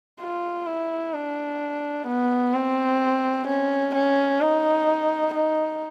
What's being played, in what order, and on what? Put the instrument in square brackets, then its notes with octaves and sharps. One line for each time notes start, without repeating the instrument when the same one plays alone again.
[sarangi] F4
E4
D4
B3
C4
C#4
C#4
D#4
D#4